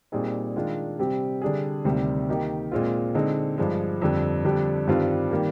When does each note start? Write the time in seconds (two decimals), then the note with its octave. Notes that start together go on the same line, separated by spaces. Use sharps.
0.12 A#2 G3 C4 D#4 G#4
0.56 D#3 G#3 D4 F4
0.99 C3 G3 C4 G4
1.42 D3 G3 D4 G#4
1.85 D2 C3 D#3 G3
2.29 D#3 A#3 D#4 G4
2.72 A#2 G#3 C4 F4
3.15 D3 G#3 C4 D#4
3.58 G2 F3 G#3
4.02 F2 D3 G3
4.44 F2 D3 G3 D4 G4
4.87 G2 D#3 G3 C4 F4
5.31 D#3 G3 A#3